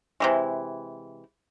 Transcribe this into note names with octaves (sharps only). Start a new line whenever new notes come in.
C3 E3 G#3